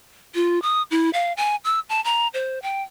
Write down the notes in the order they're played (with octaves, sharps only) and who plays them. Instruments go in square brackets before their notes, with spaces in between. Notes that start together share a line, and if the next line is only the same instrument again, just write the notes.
[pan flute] F4
D#6
E4
F5
G#5
E6
A5
A#5
C5
G5